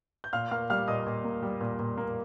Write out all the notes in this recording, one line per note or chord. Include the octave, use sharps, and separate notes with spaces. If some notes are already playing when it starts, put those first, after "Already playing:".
G6
A#2 F5 F6
A#3 F5 F6
G3 F5 F6
A#2 D#5 D#6
A#2
A#3
G3
A#2
A#2
A#3